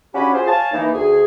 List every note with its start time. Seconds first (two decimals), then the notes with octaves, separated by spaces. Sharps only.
0.15 C#4 D4 F#4 G4 G#5 B5
0.34 F4 F#4 G#4 C5
0.47 C#5 F5 G#5 A5
0.73 E3 A#3 D#4
0.94 D2 G#4